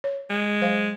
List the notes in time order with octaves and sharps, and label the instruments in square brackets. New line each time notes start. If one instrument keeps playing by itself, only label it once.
[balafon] C#5
[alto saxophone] G#3
[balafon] F#3 C5 F5